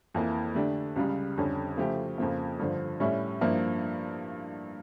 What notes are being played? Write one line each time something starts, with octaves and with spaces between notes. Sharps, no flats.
F2 E3 A#3
D3 A3 D4 G4
C#2 C#3 G3
F2 D3 G3 C#4
C#3 F3 A3 E4 G4
F2 C#3 F3 A#3
G2 D3 F3
A2 G3 C#4 E4
G2 F3 A#3 E4